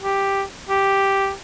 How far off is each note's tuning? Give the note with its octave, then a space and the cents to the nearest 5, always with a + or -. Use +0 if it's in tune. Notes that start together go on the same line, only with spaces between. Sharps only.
G4 +5
G4 +0